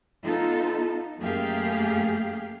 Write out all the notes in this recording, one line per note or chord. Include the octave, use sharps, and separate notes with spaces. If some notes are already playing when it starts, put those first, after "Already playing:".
B3 D#4 F4 A4
F#2 A3 A#3 G4 G#4 F5